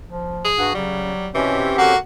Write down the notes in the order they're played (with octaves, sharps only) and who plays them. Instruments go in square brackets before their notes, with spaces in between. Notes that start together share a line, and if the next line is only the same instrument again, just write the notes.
[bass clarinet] F3
[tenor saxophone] G#4
[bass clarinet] G2 [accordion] F#4
[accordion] C#3 [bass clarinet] F#3 [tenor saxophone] G3
[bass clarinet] B2 [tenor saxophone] E3 [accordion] C4 C#4 G4
[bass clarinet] D3 [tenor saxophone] A#3 [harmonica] F#4